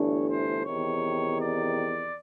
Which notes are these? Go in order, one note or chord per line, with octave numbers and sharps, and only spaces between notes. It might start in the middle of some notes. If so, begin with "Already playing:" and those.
Already playing: G1 G2 E3 A3 D4 C#5
C5
E2 C3 D#3 C#5
D5